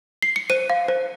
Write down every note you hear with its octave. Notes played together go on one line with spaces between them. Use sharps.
C7
C#7
C5 D#7
F5
C5